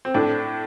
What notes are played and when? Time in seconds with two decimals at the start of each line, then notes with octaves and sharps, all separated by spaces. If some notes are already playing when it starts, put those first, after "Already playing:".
0.05 C4
0.14 A2 D4